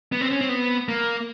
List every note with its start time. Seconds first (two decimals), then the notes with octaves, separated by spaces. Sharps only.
0.12 B3
0.21 C4
0.31 C#4
0.41 C4
0.49 B3
0.89 A#3